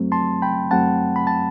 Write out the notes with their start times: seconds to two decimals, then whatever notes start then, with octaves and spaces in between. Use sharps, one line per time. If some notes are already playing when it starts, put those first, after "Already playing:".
Already playing: F#2 F#3 A3 C4
0.12 A5 C6
0.42 G5 B5
0.71 F#2 F#3 A3 C4 F#5 A5
1.16 B5
1.27 A5